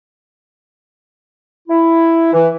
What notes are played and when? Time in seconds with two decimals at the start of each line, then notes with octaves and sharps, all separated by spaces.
1.69 E4
2.33 E3